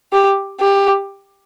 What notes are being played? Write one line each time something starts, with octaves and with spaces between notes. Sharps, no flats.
G4
G4